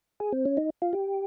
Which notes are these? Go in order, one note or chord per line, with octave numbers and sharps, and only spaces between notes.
G#4
C4
C#4
D#4
F4
G4